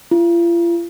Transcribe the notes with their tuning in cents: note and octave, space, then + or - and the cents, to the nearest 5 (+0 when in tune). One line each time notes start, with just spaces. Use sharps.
F4 -40